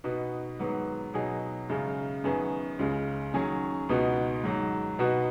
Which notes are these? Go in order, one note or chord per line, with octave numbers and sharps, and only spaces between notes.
B2 B3 D#4 F#4
G#2 D#3 F#3 B3
B2 F#3 D#4 G#4
F#2 C#3 G#3
F#2 D#3 B3 G#4
C#2 C#3 G#3
D#3 F#3 C#4 G#4
C#2 B2 B3 D#4 F#4
G#2 D#3 F#3
B2 B3 D#4 F#4